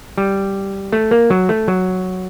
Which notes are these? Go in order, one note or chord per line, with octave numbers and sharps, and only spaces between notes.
G3
A3
A#3
F#3
A3
F#3